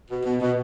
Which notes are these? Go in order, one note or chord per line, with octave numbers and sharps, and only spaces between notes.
B2
B2
B2